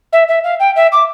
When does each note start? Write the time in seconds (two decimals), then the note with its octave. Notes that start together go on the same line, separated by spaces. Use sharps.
0.12 E5
0.28 E5
0.44 F5
0.59 G5
0.76 E5
0.92 D6